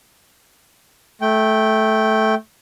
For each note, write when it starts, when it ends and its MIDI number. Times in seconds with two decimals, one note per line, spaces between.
1.22 2.35 57
1.22 2.35 79